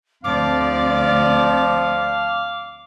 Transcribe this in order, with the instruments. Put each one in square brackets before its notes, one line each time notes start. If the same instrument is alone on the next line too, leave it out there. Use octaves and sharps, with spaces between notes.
[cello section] D2 C4 D5 [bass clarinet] F3 [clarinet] F5 [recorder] D6